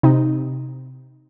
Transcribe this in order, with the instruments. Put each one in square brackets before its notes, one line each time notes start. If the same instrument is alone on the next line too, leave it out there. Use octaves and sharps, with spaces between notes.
[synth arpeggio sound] C3 D#4